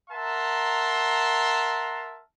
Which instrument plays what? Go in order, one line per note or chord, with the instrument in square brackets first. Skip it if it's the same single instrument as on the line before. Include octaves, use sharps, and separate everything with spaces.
[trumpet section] A#4 E5 F#5 A5 A#5 C6